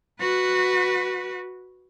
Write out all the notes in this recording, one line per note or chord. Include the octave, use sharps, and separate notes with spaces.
F#4 B4